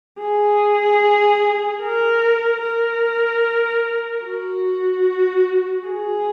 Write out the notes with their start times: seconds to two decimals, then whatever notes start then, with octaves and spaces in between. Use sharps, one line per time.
0.19 G#4
1.82 A#4
2.63 A#4
4.25 F#4
5.88 G#4